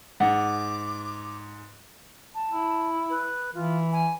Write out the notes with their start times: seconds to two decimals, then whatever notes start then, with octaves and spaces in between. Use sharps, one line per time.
0.20 G#2 F#5 D6
2.35 A5
2.51 E4
3.10 B4
3.55 E3 F4
3.93 G#5